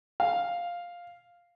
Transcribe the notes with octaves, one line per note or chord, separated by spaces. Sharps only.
F5